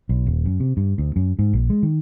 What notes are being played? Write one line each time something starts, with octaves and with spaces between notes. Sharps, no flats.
B1
D#1
F#2
C3
G2
D2
F#2
G#2
A#1
G#3
D#3